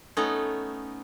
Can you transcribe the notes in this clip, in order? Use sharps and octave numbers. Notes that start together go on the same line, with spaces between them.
A3 B3 C#4 D#4